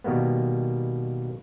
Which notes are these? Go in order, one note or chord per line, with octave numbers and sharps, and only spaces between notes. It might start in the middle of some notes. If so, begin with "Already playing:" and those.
B2 D#3 G3 A#3 B3